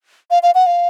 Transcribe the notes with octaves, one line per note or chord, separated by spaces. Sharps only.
F5
F5
F#5
F5